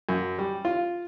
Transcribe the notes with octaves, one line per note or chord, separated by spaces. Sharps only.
F#2
G3
F4